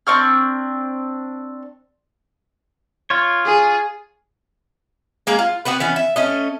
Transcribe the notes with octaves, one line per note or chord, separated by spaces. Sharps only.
C4 D4 C#6 F6
F4 C#5
G#4
G#3 A#3 G#4 A#5
F4
B3 C4 F#4 B4
E3 B3 C#4
E5
A3 C#4 D#5